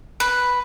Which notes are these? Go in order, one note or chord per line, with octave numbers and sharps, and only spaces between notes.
B4